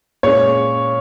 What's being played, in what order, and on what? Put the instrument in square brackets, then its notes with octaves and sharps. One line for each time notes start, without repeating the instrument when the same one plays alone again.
[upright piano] A#2 G#3 C#4 C#5